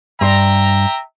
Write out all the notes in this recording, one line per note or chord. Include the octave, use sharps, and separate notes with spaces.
G2 E5 G5 A#5 C6